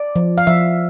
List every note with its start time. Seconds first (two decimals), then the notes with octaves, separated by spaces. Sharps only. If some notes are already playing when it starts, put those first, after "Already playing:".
Already playing: D5
0.16 F3
0.38 F5
0.47 F3 E5